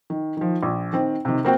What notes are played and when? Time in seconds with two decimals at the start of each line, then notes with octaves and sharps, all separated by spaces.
0.10 D#3
0.37 D#3 F3
0.63 A#1
0.93 D#3 C4
1.25 C3 D#3
1.45 A#3 C4 F#4 G5